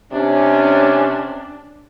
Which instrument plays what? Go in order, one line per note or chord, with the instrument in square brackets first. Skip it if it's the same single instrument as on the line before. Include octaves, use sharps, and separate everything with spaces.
[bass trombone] C3 [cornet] C#4 [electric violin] D4